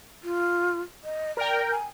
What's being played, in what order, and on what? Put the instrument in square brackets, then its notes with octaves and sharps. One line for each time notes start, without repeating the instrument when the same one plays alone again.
[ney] F4
D#5
[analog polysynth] A#4 G5 [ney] D5
[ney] G#5